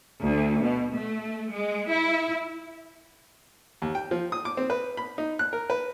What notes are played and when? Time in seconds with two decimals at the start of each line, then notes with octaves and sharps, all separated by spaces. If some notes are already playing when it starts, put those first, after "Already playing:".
0.24 D2
0.64 B2
0.95 A3
1.54 G#3
1.90 E4
3.82 D#2
3.95 G5
4.11 F3
4.32 D#6
4.45 D6
4.57 C4
4.70 B4
4.97 B5
5.18 D#4
5.39 F#6
5.53 A#4
5.70 B4